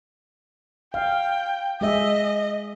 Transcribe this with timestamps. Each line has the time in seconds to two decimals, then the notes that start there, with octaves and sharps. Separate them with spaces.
0.94 F5 G5
1.81 G#3 G#4 D#5 E5